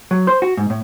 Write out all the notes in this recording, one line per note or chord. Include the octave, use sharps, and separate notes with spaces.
F#3
C5
F#4
G#2
A2